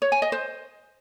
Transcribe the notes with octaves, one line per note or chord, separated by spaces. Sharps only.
C#5
G#5
D#5
C5